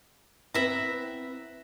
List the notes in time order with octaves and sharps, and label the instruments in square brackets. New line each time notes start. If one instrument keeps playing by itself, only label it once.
[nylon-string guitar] B3 C4 E4 [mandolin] B4 E5 A#5